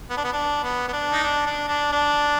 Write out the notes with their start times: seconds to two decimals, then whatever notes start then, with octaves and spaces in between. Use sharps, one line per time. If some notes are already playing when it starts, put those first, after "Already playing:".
0.10 B3
0.17 D4
0.24 B3
0.33 D4
0.63 B3
0.88 B3
0.93 D4
1.12 D#4
1.24 D4
1.46 D4
1.68 D4
1.92 D4